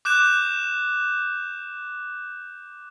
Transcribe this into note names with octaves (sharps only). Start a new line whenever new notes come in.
D6 F#6 G6 E7